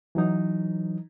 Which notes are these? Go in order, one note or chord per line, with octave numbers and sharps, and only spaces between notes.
E3 F#3 D#4